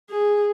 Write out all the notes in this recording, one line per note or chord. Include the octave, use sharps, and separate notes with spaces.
G#4